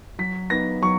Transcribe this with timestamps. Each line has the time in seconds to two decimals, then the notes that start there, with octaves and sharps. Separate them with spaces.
0.19 F#3 B6
0.50 B3 D#4 A#6
0.82 F#3 C#6